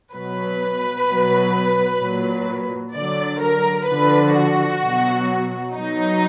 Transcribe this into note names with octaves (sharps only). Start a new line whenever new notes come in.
B2 F#3 B4
B2 F#3
A#2 F#3
D3 F#3 D5
A#4
D3 F3 B4
F#4
B2 F#3
B2 F#3 D#4